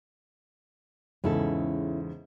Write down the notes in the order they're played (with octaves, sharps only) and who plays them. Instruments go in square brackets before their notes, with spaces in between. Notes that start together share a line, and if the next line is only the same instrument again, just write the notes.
[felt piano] E2 G#2 C#3 [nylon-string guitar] C#4 E4 A4